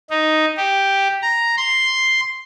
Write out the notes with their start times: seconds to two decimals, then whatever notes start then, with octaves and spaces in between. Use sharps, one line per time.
0.10 D#4
0.57 G4
1.22 A#5
1.57 C6